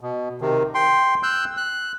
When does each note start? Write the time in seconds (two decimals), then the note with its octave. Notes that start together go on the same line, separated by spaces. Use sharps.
0.01 B2
0.41 C3 D#3
0.74 G5 C6
1.23 E6 F#6 G6
1.57 F#6